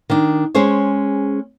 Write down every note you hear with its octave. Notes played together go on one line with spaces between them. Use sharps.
D#3 D4
G#3 C#4 G#4 C5 C#5